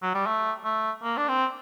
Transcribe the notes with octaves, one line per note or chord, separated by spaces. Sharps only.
F#3
G3
A3
A3
A#3
D4
C4